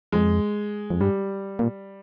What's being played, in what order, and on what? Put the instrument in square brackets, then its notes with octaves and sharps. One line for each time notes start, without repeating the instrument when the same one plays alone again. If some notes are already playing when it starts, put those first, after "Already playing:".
[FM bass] F2 [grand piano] G#3
[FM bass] F2
[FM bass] G2 [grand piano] G3
[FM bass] A#2